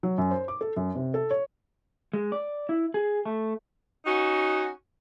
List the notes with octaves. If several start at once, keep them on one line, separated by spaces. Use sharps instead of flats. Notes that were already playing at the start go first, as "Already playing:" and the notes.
F#3
F#2
C5
D6
A4
F#2
C3
A4
C#5
G#3
D5
E4
G#4
A3
C#4 D#4 F#4